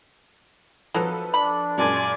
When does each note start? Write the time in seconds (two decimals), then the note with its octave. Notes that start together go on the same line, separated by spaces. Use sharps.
0.94 F3 F#3 A#3 D#4 A4 B4
1.34 D4 B5
1.78 F#2 A#2 G#3 D5 G#5